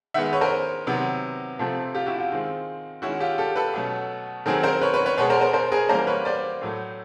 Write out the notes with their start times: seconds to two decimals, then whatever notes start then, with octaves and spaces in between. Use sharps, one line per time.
0.14 D#3 G#3 B3 E5 F#5
0.33 B4 C#5
0.41 A#4 C5
0.87 C3 D#3 F#3 B3
1.59 C3 F3 A3 C4
1.95 F4 G4
2.06 E4 F#4
2.18 F4
2.31 D#3 G#3 C4
3.02 D#3 G#3 C#4 E4 F#4
3.20 F4 G4
3.38 G4 A4
3.56 A4 B4
3.74 B2 F#3 A3 C#4
4.46 D#3 F#3 A3 C4 G#4 A#4
4.63 A#4 C5
4.82 B4 C#5
4.94 B4 C#5
5.06 B4 C#5
5.18 B2 G#3 B3 B4 C#5
5.30 A#4 C5
5.41 A#4 C5
5.53 A#4 C5
5.72 G#4 A#4
5.89 E3 G3 A#3 C#4 A#4 C5
6.07 B4 C#5
6.25 C5 D5
6.62 A2 F#3 A3